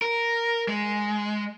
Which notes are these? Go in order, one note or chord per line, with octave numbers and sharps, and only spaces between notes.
A#4
G#3